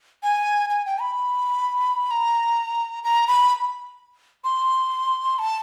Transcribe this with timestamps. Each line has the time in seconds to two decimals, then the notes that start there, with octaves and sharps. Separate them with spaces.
0.23 G#5
0.69 G#5
0.86 G5
1.01 B5
2.11 A#5
3.04 A#5
3.28 B5
4.44 C6
5.39 A5